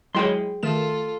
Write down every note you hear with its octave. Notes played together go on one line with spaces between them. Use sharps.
F#3 G#3 E4 G#4 G5 C6
D#3 A3 F4 A4 E7